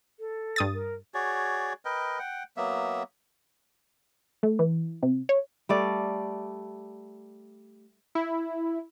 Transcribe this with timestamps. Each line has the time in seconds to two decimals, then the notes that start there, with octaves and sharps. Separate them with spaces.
0.19 A4
0.56 G2 D#6 A6
0.74 A#4
1.14 F#4 G#4 C#5 D5
1.85 A#4 B4 D#5 G5
2.19 F#5 G5
2.57 F#3 A#3 B3 E5
4.43 A3
4.59 E3
5.03 C3
5.29 C#5
5.69 G3 A3 D5
8.15 E4